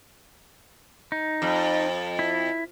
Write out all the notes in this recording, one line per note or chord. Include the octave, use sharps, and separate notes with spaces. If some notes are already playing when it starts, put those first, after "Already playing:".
D#4
F2
E4